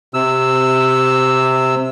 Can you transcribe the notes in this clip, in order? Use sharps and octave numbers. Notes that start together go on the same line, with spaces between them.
C3 E6